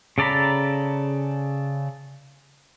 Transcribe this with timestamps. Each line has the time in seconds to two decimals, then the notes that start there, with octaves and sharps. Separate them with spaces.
0.18 C#3 A4 D5 A#5 B5